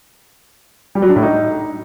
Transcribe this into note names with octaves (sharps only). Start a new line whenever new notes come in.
G3
F#3
D4
A2
D#4